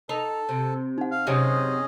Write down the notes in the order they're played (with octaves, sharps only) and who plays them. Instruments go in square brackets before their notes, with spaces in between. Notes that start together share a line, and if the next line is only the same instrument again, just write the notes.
[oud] D#4 [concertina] A4
[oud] C3
[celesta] D#4 F#5
[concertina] F5
[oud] F#2 C3 [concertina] C#4 G#4 D#5